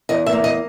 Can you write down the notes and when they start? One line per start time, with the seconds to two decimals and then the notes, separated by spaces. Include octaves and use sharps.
0.09 E2 D#5
0.26 E5
0.33 A#3
0.44 D#5